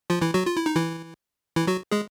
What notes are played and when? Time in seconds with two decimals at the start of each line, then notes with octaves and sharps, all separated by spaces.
0.10 F3 F4
0.22 E3 E4
0.34 F#3 F#4
0.46 F4
0.57 E4
0.66 D#4
0.76 E3 E4
1.56 E3 E4
1.67 F#3 F#4
1.91 G#3 G#4